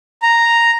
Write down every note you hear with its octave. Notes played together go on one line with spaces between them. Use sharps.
A#5